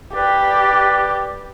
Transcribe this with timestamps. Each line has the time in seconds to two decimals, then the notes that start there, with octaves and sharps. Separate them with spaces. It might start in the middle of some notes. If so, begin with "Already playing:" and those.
0.14 G4 B4 D5